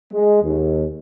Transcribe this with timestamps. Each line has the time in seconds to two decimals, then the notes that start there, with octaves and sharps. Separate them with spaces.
0.12 G#3
0.43 D#2